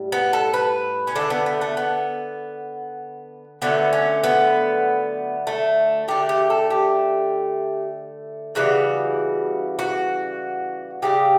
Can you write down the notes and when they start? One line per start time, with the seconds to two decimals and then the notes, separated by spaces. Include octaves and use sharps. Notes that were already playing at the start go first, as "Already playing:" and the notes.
Already playing: A2 G3
0.12 B3
0.33 A4
0.54 B4
1.07 C#4
1.15 D3 A3 D4
1.30 B3
1.46 B3
1.61 A3
1.77 B3
3.62 D3 F#3 A3 B3
3.93 C#4
4.24 B3
5.47 A3
6.08 D3 A3 G4
6.29 G4
6.50 A4
6.70 G4
8.55 C#3 E3 G3 F#4
9.79 F#4
11.02 C#3 E3 G3 G4